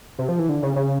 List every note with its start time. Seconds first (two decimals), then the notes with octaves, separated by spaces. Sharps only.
0.19 C3
0.29 F3
0.39 E3
0.49 D3
0.63 C#3
0.76 C#3